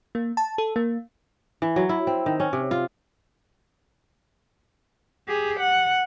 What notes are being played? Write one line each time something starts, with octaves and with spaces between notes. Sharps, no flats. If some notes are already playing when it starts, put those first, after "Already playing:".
A#3
A5
A4
A#3
E3
F#3
E4
C4
D#3
C#4
C3
F4
G4 G#4
F#5